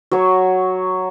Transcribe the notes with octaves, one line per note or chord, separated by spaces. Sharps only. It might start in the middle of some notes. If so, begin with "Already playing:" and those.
F#3 C#5